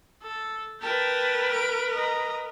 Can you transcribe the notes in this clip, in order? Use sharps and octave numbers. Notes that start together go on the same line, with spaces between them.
A4
A#4 B4 G5 A5
D7
D#5 A#5